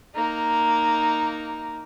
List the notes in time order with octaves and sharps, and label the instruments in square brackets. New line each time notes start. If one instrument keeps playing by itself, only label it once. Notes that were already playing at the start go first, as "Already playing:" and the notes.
[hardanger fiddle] A#3 D#4